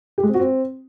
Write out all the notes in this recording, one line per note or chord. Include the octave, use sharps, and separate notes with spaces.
G4
G#3
C4
F#4
C4